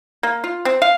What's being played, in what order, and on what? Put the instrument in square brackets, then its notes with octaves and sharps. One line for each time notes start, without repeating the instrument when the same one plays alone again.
[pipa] A#3
F4
C4
F5